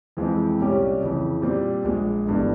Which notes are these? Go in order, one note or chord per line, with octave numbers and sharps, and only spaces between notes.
F2 E3 G#3 C4 F4
C2 A#2 G3 C#4 G4
F2 C#3 E3
A#2 G3 C4
A#1 A#2 G#3
G1 G2 E3